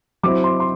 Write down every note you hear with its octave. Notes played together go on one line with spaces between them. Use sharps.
F#3 C4 E4 D6
C6
C6